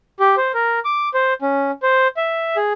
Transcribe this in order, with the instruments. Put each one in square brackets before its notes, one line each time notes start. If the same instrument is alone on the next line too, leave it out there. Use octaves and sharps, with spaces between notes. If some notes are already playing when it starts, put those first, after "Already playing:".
[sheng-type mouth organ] G4
C5
A#4
D6
C5
C#4
C5
E5
G#4